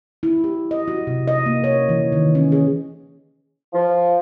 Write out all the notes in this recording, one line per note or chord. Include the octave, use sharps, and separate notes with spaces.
E4
G4
D#5
F#4
C3
D#5
A#3
C#5
E3
D#3
C#4
G#4
F3